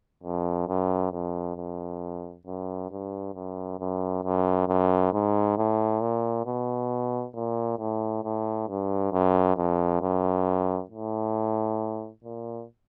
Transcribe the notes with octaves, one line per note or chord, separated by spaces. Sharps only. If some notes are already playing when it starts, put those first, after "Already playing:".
F2
F#2
F2
F2
F#2
G2
F#2
F#2
F#2
F#2
G#2
A2
A#2
B2
A#2
A2
A2
G2
F#2
F2
F#2
A2
A#2